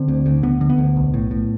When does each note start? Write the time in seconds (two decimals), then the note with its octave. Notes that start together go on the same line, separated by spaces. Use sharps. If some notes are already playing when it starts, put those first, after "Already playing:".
Already playing: D3 C4
0.08 D2
0.26 D2
0.43 D3 B3
0.61 D3
0.70 B3
0.78 D2
0.96 B1
1.14 A2
1.31 A2